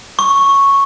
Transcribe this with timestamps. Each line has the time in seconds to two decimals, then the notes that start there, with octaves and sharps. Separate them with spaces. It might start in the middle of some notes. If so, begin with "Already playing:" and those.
0.19 C#6